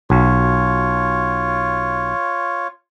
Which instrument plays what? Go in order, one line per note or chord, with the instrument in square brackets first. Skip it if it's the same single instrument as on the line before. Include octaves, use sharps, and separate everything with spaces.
[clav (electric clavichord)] B1 [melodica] F4 C#5